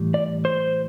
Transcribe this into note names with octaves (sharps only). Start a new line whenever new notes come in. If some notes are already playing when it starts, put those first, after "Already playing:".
Already playing: A2 E3 G3
D5
C5